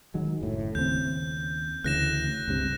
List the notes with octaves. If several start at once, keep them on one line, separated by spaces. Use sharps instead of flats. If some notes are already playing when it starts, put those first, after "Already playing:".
D#3 F#3 G#3
F#1 A2
D#2 C#3 C4 G6
D2 C#3 E3 F#6 A#6 E7
C#2 G2 C3